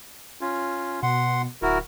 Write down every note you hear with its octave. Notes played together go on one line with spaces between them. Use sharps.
C#4 F4
B2 F#5 C6
D1 E4 F#4 A#4